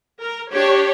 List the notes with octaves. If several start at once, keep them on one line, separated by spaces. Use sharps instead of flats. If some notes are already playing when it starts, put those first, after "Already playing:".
A#4
D4 G4 C#5